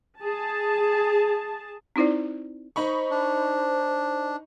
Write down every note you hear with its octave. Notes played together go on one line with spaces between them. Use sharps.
G#4 A5
C4 D#4 E4 C5 D5
D#4 C5 B5 C#6
D4